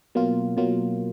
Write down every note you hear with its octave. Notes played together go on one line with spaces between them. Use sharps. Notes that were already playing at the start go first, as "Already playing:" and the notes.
B2 F#3 A#3 F4
B2 F#3 A#3 F4